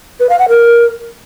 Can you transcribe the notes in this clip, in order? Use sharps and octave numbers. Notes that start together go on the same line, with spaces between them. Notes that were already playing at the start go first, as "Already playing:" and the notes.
B4
F5
F#5
A#4